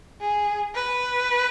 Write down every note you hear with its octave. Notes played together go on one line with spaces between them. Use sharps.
G#4
B4